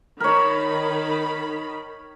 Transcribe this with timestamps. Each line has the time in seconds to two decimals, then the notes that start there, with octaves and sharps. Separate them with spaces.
0.20 D#3 A#4 C#5 B5